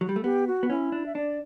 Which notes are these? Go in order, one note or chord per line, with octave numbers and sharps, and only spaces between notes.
F#3
G3
A3
B3 G4
F#4
B3
C#4 E4
D4
E5
D4 D5